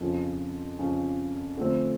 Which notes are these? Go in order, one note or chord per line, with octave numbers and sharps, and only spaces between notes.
F2 C#3 F3
F2 C#3 F3
D3 F3 A3 C4